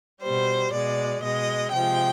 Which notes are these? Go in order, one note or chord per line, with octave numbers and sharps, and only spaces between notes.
B2 G3 C5
B2 G#3 D5
B2 G#3 D#5
C3 F3 G#3 G5